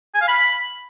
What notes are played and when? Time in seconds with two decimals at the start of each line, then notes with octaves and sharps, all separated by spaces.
0.14 G#5
0.21 F5
0.28 B5